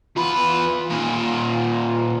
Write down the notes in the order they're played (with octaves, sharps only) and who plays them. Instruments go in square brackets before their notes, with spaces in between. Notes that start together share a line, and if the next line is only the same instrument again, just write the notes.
[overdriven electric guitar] E2 B4 [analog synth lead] F4
[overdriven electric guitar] A#2 D#3